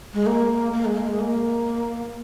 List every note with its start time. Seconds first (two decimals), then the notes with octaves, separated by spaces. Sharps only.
0.13 G#3
0.27 A#3
0.73 A#3
0.85 G#3
0.97 A#3
1.08 G#3
1.20 A#3